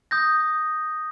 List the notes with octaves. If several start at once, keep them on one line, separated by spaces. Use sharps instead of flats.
D#6 G6 A#6